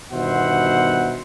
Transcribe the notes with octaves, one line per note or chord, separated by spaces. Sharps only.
G1 B2 D#3 C5 E5 F#5